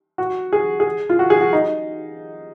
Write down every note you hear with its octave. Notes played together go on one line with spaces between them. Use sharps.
F#4
G#4
G#4
F4
F#4
G#4
F#4
D#4